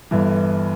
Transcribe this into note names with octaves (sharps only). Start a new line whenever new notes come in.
G1 G2 E3